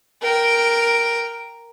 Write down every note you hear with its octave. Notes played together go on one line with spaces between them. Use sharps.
A#4 G5